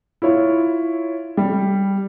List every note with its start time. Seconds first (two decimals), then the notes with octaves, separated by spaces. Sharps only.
0.22 E4 F4 C#5
1.37 G3